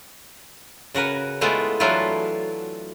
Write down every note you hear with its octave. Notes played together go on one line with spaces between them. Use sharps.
C#3 F#4 A#4 B4
G#3 A3 B3 E4 F4
E3 F#3 A3 D4 E4 F4